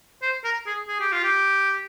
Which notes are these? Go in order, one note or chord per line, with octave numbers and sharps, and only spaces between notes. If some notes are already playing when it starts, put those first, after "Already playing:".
C5
A#4
G#4
G#4
G4
F4
G4